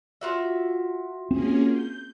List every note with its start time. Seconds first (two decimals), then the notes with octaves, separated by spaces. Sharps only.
0.21 F4 F#4 E5
1.31 A#3 C4 C#4 G#4
1.71 G6